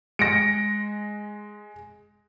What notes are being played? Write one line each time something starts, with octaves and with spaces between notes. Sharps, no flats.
G#3 A#6 C#7 D7